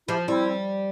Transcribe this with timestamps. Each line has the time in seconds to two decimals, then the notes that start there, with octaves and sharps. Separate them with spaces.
0.08 F3 E4 G4
0.28 G3 C4 E4